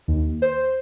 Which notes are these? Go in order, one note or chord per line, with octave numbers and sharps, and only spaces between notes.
D#2
C5